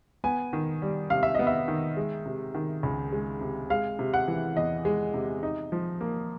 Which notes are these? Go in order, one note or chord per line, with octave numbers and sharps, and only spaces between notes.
B3 G#5
D#3
G3
C3 F5
E5
B3 D#5
E5
D#3
G#3
C3
D#3
C#2
G#3
C3
G#3 F5
C3
F#5
E3
E2 D#5
G#3
C3
D#4
F3
A#3